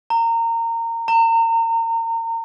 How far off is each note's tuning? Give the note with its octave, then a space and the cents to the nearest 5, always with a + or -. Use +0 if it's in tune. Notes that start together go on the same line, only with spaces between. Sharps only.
A#5 -25
A#5 -35